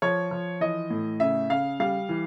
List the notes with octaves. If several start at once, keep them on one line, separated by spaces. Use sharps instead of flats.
F3 C#5
F3
E3 D#5
A2
C#3 E5
C#3 F5
G3 F5
E3